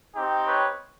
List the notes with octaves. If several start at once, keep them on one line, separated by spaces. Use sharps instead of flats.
C4 D#4 G4
B4 C#5